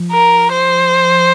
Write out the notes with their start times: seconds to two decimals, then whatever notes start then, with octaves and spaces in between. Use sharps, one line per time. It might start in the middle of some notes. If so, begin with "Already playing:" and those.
Already playing: F3
0.12 A#4
0.52 C5